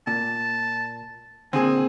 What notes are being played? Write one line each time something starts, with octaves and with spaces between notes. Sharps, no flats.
A#2 A5
A#2 D3 C4 G#4 G#5